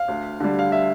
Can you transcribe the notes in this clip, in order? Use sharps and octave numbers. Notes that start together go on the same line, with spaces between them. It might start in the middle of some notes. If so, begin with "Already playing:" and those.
Already playing: F5
D2
D3 G3
F5
E5